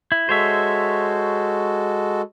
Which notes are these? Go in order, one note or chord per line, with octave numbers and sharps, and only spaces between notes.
E4
G#3 F#4 A4 C5 C#5 E5